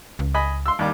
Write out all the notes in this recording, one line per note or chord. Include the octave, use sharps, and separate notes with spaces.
C#2
D#5 G#5 B5
C6 E6
D#2 G3 D6